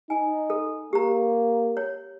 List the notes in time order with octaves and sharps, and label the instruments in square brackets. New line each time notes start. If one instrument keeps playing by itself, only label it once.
[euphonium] D#4 [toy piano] G#5
[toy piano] A4
[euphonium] A#3 [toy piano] G4 A#5
[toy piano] C#5